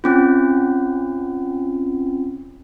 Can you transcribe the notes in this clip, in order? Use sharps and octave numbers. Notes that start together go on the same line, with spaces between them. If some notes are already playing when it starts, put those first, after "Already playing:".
C4 C#4 F4